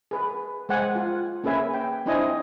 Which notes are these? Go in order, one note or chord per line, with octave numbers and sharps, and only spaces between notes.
G#4 B4
G#3 C5 F#5 G#5
F4
A#3 C#4 G#4 B4 E5 G#5
G5
C4 D4 E4 C5 D#5 G#5